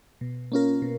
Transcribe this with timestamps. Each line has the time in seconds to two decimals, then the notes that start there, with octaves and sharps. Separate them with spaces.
0.21 B2
0.52 A#3 C#4 F4 A#4
0.82 B2